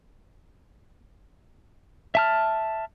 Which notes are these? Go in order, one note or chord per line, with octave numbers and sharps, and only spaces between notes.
E5 A5 F6